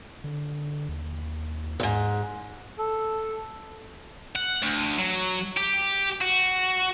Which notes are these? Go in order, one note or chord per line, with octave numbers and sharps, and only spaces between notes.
D3
D#2
E2 G#2
A4
F#5
D2
F#3
G4
F#4